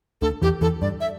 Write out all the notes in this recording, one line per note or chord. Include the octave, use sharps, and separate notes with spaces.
D2 D3 A4
E2 E3 G4
E2 E3 A4
G2 D5
E5